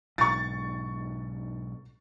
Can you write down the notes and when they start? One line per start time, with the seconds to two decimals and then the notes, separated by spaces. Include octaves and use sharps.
0.18 B1 G#2 C#6 A6